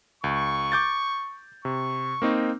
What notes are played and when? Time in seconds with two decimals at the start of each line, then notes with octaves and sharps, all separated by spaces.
0.24 C#2 C#6
0.72 D6 G6 A6
1.65 C3 C#6
2.22 A#3 C4 D#4